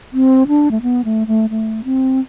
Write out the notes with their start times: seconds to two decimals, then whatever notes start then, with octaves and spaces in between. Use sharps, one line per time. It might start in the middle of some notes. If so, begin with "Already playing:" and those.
0.13 C4
0.48 D4
0.71 A3
0.82 B3
1.05 A3
1.27 A3
1.50 A3
1.84 C4